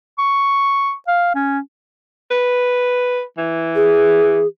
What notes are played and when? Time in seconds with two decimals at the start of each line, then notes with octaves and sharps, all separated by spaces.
0.19 C#6
1.07 F5
1.35 C#4
2.31 B4
3.38 E3
3.75 G#4